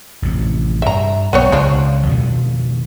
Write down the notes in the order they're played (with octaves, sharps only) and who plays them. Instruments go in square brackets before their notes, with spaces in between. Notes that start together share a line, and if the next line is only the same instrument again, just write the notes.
[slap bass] A1 F2 C3
[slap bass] G2 [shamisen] E5 A#5
[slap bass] B1 [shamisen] B3 C4 C#5
[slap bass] C#2 [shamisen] F3 D4 F4
[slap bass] F2 B2 D#3